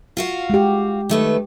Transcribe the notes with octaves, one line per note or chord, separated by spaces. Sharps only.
F4 F#4 F5
G#3 G4
D#3 A3 B4